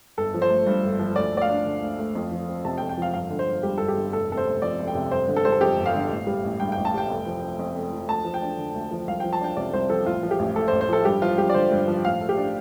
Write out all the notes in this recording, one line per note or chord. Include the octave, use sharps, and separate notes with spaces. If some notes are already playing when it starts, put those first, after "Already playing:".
G1 A4
F3
C5
A3
G2
G1
F3
D2 D5
A3 D5
F5
D4
D3
D2
A3
F2
F3
C4
C3 A5
G5
F2
G5
F3 F5
G1 F5
D3
C5
G1
G2 G4
G1 A4
G4
D3
F1 A4
C3 A4
C5
F1
F2 D5
F1
G5
C3
G1 C5
D3
A4
G3 C5
A4
F2 G4
G1
F5
D3
A1
G3
A1
G2 G5
G5
A1
A5
G3 G5
F1
F3
C4
F2
F1
F3
D2 A5
F3
G5
D4
D3
D2
F3
C2 F5
F3 G5
A5
D4 G5
C3 D5
C2 C5
F3 A4
A1 F4
F3
G4
A1
A2 A4
C5
A1
C5
F3 A4
G2 G4
F3 F4
G2 G4
D5
D3 C5
G2
F3
A1 F5
A3
G4
D4